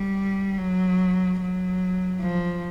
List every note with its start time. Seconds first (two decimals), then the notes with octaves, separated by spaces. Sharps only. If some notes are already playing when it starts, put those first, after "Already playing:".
Already playing: G3
0.59 F#3
1.41 F#3
2.21 F3